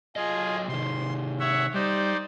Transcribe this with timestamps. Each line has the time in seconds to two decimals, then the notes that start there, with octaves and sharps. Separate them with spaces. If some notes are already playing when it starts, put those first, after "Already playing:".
0.16 F#3 F4 G#4 D#5
0.68 C3 D#3 C6
1.40 C#5 E5 F#5
1.74 G3 D#4 C5 D5